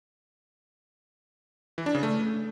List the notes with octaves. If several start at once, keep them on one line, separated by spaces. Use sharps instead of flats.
E3
D4
C#3
A3